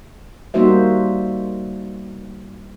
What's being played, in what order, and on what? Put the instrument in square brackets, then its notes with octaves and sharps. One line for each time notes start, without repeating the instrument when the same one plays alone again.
[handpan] G3 A#3 D#4 F#4 C5 E5